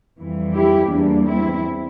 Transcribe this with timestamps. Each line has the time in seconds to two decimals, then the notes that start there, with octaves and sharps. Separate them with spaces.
0.18 F2 E3 G3
0.54 E4 G4
0.90 E2 E3 G3 A#3 D4
1.26 C4 E4